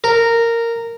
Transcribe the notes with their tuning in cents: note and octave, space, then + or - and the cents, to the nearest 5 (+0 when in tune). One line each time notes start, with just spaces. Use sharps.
A#4 -10